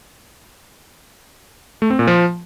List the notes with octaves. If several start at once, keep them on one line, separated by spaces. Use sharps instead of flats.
A3
C4
A#2
F3